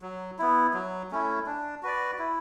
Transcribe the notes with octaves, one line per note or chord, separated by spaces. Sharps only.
F#3
B3 E4
F#3
A3 C#4 E4
D4
F#4 B4 D5
E4